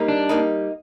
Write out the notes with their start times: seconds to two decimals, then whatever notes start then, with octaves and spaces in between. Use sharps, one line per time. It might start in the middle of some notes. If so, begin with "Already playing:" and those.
Already playing: G3 A#3 D#4
0.08 D4
0.29 G3 A#3 D#4